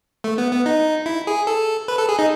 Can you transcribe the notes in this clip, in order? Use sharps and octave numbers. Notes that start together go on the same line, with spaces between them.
A3
B3
B3
D#4
E4
G#4
A4
B4
A4
G#4
D#4